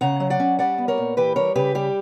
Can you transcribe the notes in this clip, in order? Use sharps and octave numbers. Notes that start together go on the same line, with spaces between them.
C#3 F#5 A#5
F#3
D5 F#5
C#4
G3 D5 F#5
B3
A#4 C#5
A#2
E3 G4 B4
G3 A#4 C#5
C#3 G4 B4
G3 G4